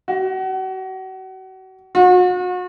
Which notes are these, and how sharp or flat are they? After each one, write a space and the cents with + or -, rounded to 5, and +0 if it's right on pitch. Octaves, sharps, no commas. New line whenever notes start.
F#4 +35
F#4 -35